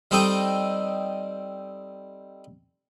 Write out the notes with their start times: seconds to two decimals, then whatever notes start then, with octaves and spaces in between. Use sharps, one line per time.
0.11 G3 C4 D#4 A4 D#5 G5